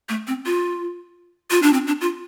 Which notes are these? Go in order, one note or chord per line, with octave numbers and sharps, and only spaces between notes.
A3
C4
F4
F4
D4
C4
D4
F4